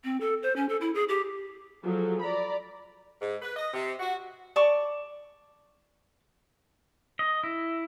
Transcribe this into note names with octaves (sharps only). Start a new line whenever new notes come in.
C4
A4
C5
C#4
A4
E4
G#4
G4
F3 F#3 G#4 A4
D5 A#5 B5
G#2
B4
D#5
C3
F#4
D5 A5 C#6 D6
D#5
E4